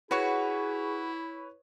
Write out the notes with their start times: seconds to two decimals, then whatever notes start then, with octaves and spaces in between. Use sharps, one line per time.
0.11 E4 F#4 G#4 B4 C#5 F#5 C#6